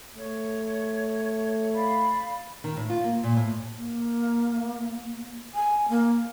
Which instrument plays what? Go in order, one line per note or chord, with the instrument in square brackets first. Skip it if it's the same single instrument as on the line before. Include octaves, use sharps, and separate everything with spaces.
[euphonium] A3 [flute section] C#5
[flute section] D5 F5 B5
[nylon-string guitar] D#3
A2
F4
A#3
A#2
A2
[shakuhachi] A#3
G#5
A#3